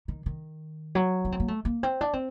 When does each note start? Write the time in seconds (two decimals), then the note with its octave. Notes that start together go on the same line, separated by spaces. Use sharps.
0.08 D#3
0.26 D#3
0.95 F#3
1.25 D4
1.32 C4
1.40 A#3
1.48 A3
1.65 A#3
1.83 C4
2.01 D4
2.13 C4